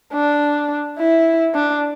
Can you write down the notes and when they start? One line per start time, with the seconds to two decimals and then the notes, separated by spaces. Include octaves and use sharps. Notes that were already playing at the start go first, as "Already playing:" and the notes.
0.13 D4
0.99 E4
1.54 D4